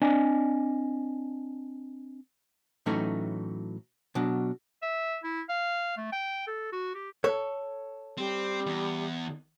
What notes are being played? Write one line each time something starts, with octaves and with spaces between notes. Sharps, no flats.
C4 D4 D5 D#5 G#5
A2 E3 F#3 A3 C#4 D#4
B2 F#3 D4
E5
E4
F5
A3
G5
A4
F#4
G4
A4 C#5
G3 C4
E2